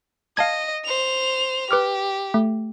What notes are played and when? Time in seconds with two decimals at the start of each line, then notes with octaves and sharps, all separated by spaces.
0.37 D#5 F5 A5 G#6
0.85 C5 F7
1.71 G4 B4 D6 F6
2.34 A3